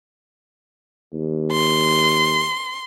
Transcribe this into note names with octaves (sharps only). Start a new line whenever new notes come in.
D#2
C6